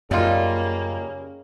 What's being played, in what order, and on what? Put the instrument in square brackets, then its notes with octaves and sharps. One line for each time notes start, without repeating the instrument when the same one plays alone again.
[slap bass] F#2 [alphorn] C#3 [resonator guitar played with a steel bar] G3 D#4 F4 [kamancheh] A#3